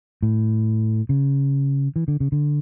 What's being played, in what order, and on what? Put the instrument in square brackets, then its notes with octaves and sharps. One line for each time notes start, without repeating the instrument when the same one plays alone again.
[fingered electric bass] A2
C#3
E3
D3
C#3
D3